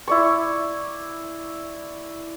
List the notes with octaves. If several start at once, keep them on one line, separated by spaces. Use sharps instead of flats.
E4 D5 C#6